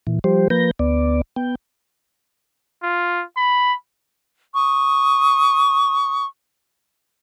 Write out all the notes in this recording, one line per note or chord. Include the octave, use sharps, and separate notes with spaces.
A#2 E3
F3 G3 G4 C5
F3 A#3 B4 G6 A#6
D2 B3 D5
B3 G5
F4
B5
C#6 D#6